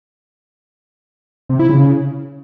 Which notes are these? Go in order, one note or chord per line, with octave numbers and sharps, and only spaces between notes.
C3
E4
C#3